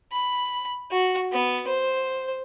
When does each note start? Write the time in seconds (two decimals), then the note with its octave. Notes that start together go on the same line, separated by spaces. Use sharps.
0.12 B5
0.91 F#4
1.32 B3
1.67 C5